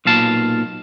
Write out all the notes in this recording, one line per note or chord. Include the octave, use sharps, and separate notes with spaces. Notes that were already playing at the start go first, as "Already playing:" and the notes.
B1 A#2 F5 A5